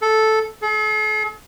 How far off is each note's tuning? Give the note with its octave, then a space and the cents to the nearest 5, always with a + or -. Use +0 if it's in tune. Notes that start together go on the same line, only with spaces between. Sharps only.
A4 -5
A4 -45